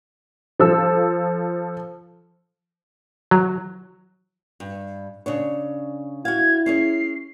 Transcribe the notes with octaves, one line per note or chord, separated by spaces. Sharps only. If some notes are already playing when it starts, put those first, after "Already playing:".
F3 A4 E6
F#3
G2
C#3 D4 C#5
E4 F#4 F5 G#6
C#4 G#4 C#5 C7